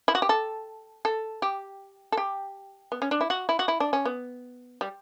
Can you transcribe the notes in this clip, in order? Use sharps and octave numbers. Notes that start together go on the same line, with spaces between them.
E4
F#4
G4
A4
A4
G4
A4
G4
B3
C#4
D4
E4
F#4
E4
F#4
E4
D4
C#4
B3
G3